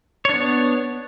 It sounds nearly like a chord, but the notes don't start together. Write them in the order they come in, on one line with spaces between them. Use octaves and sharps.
C#5 D4 B3